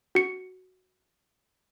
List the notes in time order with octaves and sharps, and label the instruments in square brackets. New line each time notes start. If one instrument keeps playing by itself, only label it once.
[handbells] F#4 C#7